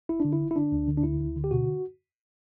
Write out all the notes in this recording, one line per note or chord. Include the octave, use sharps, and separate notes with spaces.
G1 E4
D3 D4
E4
G1
E4
D3 D4
D2
D3
D4
D2 E4
D2
D3
G4
B2 F#4